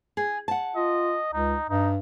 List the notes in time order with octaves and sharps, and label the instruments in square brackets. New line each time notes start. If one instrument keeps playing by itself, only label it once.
[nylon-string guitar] G#4
F#5 A5
[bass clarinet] F4 [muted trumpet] D#5
[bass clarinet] C#2 [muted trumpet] D#4
[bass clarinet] G2 [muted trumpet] D#4